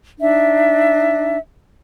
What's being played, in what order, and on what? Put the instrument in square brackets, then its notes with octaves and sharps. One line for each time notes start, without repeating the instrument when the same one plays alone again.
[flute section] D4 D#4 E5